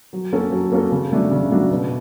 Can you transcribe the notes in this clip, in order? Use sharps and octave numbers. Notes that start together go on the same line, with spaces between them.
F#3
A#3 C#4 F#4 A4
F#3
A#3 C#4 F#4 A4
C#3
F#3 A3 D4 F#4
C#3
F#3 A3 D4 F#4
B2